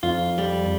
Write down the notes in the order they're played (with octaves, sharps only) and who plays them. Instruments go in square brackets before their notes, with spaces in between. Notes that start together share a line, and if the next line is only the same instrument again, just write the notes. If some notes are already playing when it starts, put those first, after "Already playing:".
[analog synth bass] F2 [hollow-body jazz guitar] F4
[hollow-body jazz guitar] G3